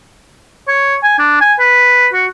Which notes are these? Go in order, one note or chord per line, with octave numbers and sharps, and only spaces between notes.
C#5
G#5
D4
G#5
B4
F#4